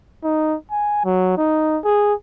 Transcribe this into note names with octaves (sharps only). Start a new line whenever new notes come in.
D#4
G#5
F#3
D#4
G#4